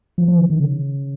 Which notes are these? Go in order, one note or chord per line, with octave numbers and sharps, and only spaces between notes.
F3
F3
D#3
D#3
C#3